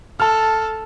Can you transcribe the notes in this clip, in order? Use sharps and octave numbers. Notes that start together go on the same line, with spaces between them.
A4 A5 F6